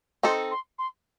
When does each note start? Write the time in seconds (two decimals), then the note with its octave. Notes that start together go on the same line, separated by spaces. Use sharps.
0.23 C4 D#4 A4 C6
0.51 C6
0.78 C6